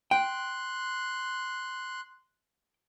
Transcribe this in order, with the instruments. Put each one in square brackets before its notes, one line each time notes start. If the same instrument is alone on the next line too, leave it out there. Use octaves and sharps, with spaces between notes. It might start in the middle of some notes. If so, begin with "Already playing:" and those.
[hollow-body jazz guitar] G5 [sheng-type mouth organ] C6 F#6